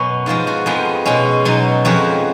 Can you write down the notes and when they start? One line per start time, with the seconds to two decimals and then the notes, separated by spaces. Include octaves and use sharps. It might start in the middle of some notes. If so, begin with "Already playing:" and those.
Already playing: F#2 B2 F#3 B3 C#4
0.26 G#2 F3 G#3 F4
0.47 F#4
0.66 F2 F3 G#3 B3
1.05 B2 G#3 C#4
1.45 B2 F#3 D#4
1.85 F2 F3 G#3 F#4